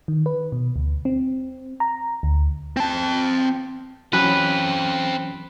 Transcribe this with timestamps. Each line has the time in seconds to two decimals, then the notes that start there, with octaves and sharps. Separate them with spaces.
0.08 D#3
0.26 B4
0.52 B2
0.76 D2
1.05 C4
1.80 A#5
2.23 D2
2.77 C4 A5
4.13 E3 F#3 C4 C#4 A4 B4